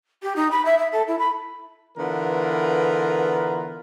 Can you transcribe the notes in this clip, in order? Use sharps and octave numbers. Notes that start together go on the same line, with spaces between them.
G4
D#4
B5
E5
E5
A4
E4
B5
D3 E3 B3 F4 A#4